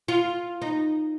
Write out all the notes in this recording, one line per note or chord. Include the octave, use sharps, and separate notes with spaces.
F4
D#4